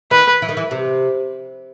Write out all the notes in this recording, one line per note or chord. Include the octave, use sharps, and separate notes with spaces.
D#3 B4
E3
D#3
E3
C3